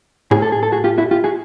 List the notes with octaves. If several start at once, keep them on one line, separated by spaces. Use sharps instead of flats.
A2 G#4
A4
G#4
A4
F#4 G#4
F4 G4
E4 F#4
F4 G4
F#4 G#4